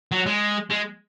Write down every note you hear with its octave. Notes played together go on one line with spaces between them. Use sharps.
F#3
G#3
G#3